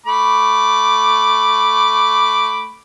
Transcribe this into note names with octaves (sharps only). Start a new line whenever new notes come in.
A3 B5 D6